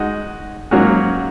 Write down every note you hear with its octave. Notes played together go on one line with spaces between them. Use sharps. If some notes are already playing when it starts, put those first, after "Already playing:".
Already playing: G#3 D#4 F#4
G#2 F#3 A#3 C#4 F#4